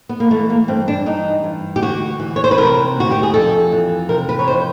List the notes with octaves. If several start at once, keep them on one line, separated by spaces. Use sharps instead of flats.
B3
A#3
E3 A3
A#3
G2 C4
D4
E3 D#4
G2
G4
D2 F#4
E3
C#5
C5
B4
C3 A#4
D2 F#4
G4
G#4
F2 A4
E3
C3 A#4
B4
C#5
F2 C5